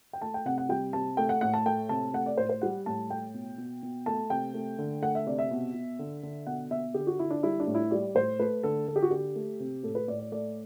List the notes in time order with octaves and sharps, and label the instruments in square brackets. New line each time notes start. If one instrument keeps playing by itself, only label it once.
[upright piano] G5
A3 A5
G5
C3 F#5
F#5
G3 G5
C3 A5
A3 G5
F#5
A2 F#5
A5
A3 G5
C3 A5
A3 F#5
D5
A2 C5
C5
G3 F#5
A2 A5
A3 G5
B2
B2
B2
A3 A5
C3 G5
A3
D3
A3 F#5
E5
C3 D5
E5
B2
B2
D3
D3
B2 F#5
B2 E5
D3 G4
F#4
D3 E4
D4
G3 E4
D4
A2
E4
G3 D5
A2 C5
A3 B4
D3 A4
D3 A4
G4
F#4
D3 G4
A3
C3
A2 A4
B4
A2 D5
D5
A3 D5